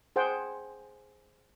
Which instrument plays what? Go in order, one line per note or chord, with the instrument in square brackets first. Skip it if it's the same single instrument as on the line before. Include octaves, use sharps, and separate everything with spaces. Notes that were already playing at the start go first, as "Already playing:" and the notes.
[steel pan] G#4 C5 F#5 G5